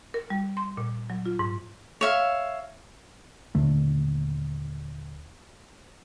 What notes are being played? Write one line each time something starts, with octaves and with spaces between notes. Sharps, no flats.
A#4
G3
C6
A#2
F#3
F4
G#2
C#5 E5 F5
D#1 D3 A3